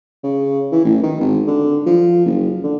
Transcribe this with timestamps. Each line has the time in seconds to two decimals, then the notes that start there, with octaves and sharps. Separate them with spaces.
0.23 C#3
0.72 E3
0.84 A1
1.03 D#3
1.20 G#1
1.47 D3
1.86 F3
2.25 F#1
2.63 D3